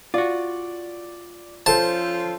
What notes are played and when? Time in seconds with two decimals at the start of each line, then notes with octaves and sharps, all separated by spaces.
0.14 F4 F#4 D5
1.66 F3 C#4 F4 A4 C5 A5